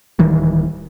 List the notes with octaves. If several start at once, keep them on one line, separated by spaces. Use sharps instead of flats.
D1 D#3 E3 G3